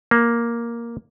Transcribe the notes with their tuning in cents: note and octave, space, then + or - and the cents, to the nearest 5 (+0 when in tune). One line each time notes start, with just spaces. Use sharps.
A#3 +5